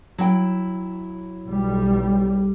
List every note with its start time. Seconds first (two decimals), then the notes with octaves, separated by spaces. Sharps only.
0.18 F#3 E4 G5
1.48 B1 G3